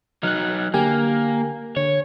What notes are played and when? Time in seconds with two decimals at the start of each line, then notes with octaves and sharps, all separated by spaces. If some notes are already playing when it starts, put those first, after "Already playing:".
0.23 F#3 D#4 F6 F#6
0.74 D3 A#3 G4 G#5
1.77 D3 C#5